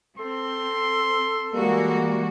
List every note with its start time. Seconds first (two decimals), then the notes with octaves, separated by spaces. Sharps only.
0.19 C4 A4 C6
1.53 E3 G3 G#3 A#3 F#4